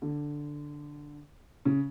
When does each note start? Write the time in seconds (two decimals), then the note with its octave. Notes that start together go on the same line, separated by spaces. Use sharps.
0.02 D3
1.65 C#3